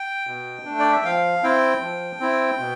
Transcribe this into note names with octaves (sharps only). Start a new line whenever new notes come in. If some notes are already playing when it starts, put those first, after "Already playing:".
Already playing: G5
B2
A3 D4
D5
E5
F3 F5
C4 E4 G5
F3
C4 E4
B2